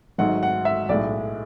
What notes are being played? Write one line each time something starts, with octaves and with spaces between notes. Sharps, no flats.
G#1 G#2 F#3 A3 F#5
F#5
E5
B1 A2 G#3 D5